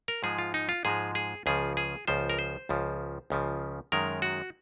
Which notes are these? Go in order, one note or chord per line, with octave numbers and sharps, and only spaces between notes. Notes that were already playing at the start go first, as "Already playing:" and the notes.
A#4
G#2 F3 G#3 G#4
F4
D#4
F4
G#2 F3 G#3 G#4
G#4
C#2 C#3 F3 G#4
G#4
C#2 C#3 F3 C5
A#4
C5
C#2 C#3 F3
C#2 C#3 F3
F#2 D#3 G#3 A#4
F#4